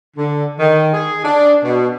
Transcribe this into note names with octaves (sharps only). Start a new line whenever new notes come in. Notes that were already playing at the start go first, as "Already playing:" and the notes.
D3
D#3
G#4
D4
B2